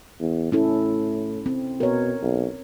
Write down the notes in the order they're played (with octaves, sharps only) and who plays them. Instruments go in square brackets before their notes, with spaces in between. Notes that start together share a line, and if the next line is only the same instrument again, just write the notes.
[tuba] E2
[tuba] A2 [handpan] C#4 E4 A4
[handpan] C4
[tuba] B2 [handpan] A#4 C#5
[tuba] B1